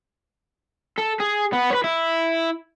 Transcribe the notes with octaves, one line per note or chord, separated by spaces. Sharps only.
A4
G#4
B3
B4 C#5
E4